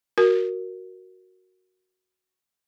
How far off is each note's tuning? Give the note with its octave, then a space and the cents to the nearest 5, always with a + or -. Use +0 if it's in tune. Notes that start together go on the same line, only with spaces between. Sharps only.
F#4 +0 A#4 +0